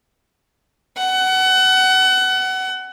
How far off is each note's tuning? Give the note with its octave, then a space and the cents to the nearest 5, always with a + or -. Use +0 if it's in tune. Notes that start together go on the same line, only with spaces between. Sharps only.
F#5 +25